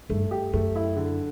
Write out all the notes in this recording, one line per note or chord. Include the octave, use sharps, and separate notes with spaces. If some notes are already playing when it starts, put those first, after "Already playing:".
G2 A3
G4
F#2 A3
E4
D3